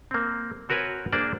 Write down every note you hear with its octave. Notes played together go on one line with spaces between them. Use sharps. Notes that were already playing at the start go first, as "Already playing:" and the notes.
A#3 C4
C4 F#4 A#4 B4 C#5 G#5
A#3 D4 F#4 G#4 C5 D5